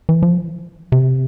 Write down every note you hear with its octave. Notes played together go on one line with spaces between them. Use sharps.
E3
F3
C3